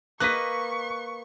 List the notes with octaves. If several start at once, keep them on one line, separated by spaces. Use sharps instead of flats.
A#3 B4 D#5 C#6 F#6 B6